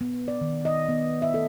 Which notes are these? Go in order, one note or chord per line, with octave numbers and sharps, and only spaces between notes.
B3
D5
D#3
D#5
B3
E5
A4